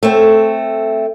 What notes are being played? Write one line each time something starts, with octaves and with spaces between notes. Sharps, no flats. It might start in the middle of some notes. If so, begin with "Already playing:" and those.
A3 C4